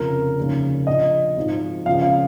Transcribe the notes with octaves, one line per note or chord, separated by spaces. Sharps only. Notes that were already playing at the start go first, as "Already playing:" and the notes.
Already playing: F1 F2 C#3 F3 A#4
F1 D#2 C#3 F3
A#1 A#2 F3 D#5
G#1 G#2 F3
C#2 C#3 F3 F5
F5